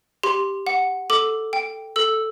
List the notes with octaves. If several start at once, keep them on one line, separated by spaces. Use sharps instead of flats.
G4 C6
F#5
A4 D6
G5
A4 E6